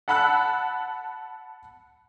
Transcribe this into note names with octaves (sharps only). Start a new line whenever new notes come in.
F#5 A5 B5 E6 F#6